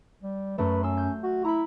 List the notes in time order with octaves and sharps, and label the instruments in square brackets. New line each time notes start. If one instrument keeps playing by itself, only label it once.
[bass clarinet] G3
[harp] F#2 A3 [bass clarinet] B4
[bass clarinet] C#4 [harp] C6 E6
[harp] G6
[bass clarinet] F#4
[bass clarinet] E4 [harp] A#5 B5